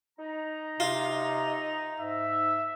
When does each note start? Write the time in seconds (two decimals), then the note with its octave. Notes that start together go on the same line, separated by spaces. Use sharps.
0.19 D#4 A#5
0.80 C3 F4
2.00 G#2 E5